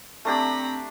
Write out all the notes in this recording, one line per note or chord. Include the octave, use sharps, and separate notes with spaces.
A3 C4 D4 G4 A#5 B5